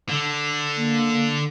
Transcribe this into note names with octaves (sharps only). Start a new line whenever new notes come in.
D3
A#3